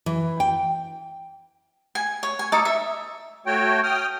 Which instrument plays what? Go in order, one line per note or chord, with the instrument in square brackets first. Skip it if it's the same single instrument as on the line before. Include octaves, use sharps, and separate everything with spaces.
[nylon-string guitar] E3
G5
[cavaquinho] G#5
C#5
G#5
D#4 A4 D6
E5
[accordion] A3 F#4 C#5 G5
G5 D#6 F6